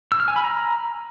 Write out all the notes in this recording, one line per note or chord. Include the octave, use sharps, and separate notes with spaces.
E6
F6
G#5
B5
A#5